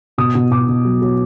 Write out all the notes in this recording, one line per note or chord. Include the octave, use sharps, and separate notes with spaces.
B2 D#6
B2
B2 D6
B2
F#3
F#3